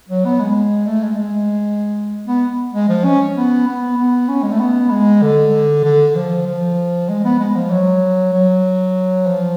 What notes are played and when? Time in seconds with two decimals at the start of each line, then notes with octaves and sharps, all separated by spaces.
0.09 F#3
0.25 B3
0.40 G#3
0.87 A3
1.03 G#3
1.18 G#3
2.27 B3
2.73 G#3
2.89 F3
3.04 C#4
3.36 B3
3.67 B3
3.98 B3
4.29 C#4
4.43 G#3
4.51 A3
4.60 B3
4.91 G#3
5.22 D3
5.84 D3
6.15 F3
6.46 F3
7.09 G#3
7.25 B3
7.39 G#3
7.56 F3
7.71 F#3
8.33 F#3
9.27 F3